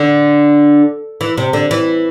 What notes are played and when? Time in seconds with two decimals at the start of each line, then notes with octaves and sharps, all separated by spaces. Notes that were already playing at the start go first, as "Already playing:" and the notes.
Already playing: D3
1.21 E3
1.37 C3
1.53 D3
1.71 E3